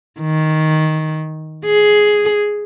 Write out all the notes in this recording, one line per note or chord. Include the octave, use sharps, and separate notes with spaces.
D#3
G#4